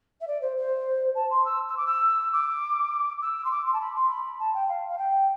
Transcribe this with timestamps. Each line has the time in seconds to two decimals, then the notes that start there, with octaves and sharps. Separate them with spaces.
0.21 E5
0.27 D5
0.41 C5
0.57 C5
1.15 A5
1.30 C6
1.45 E6
1.68 E6
1.77 D6
1.86 E6
2.33 D6
3.21 E6
3.44 C6
3.51 D6
3.66 C6
3.73 A5
3.81 B5
3.95 C6
4.10 B5
4.39 A5
4.54 G5
4.68 F5
4.88 F5
4.98 G5